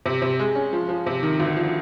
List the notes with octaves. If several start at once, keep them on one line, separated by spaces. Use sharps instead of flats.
C3
C3
G#3
C#4
F3
F3
C3
D#3
D2
F3